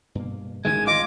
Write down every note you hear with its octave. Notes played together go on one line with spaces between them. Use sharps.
G2 B2 A#3
A1 D#3 G#3 G#6
F4 D#5 D6